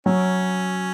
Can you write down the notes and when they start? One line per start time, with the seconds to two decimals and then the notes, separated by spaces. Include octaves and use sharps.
0.06 F#3 C#4